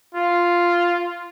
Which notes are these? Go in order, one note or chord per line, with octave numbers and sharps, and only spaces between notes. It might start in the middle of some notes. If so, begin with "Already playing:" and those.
F4